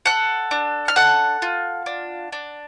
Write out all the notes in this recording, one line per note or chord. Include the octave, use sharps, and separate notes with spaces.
A4 F#5 F#6
D4
F6
A4 F#5 F#6
F4
D4
D4